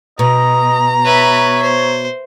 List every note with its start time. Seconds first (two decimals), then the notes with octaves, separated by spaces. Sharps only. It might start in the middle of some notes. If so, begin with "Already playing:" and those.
0.19 B2 D#5 A#5
1.05 B4 C#5 E5
1.62 C5